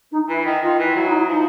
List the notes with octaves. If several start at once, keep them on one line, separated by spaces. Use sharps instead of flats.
D#4
E3 E4
D#3
D#3 F4
E3
F#3 E4
D#4
E4
F3 D#4